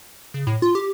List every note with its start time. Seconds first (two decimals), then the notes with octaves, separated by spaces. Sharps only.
0.34 C#3
0.47 A2
0.62 F4
0.75 G4